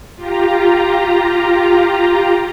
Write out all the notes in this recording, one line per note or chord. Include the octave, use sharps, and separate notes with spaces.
F4 G4 A#5